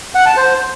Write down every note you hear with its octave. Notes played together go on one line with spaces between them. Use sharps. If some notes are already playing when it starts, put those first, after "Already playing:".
F#5
A5
C5